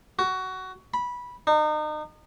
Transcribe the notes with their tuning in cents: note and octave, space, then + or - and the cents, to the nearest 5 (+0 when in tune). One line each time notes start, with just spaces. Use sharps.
F#4 +15
B5 -15
D#4 -35